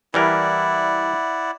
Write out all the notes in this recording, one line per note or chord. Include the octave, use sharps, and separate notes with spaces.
E3 G3 E4 A#4 D5 F#5